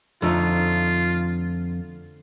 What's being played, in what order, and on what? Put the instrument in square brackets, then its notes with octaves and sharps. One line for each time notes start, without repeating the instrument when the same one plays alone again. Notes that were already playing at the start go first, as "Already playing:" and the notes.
[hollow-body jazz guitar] F2 [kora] D3 A3 D#4 [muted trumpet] F4